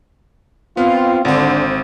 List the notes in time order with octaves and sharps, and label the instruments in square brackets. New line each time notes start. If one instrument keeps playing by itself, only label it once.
[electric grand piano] B3 [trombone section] C4 F4
[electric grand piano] G#1 C4 [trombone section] D3